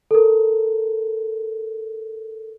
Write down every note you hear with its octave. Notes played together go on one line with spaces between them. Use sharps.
A4 A#4